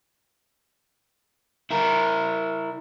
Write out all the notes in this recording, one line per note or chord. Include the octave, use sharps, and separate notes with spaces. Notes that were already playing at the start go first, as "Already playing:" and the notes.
E4 A#4